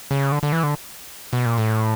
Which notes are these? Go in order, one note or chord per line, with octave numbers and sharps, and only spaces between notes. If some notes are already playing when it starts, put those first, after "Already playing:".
C#3
D3
D3
E3
D3
B2
A#2
A2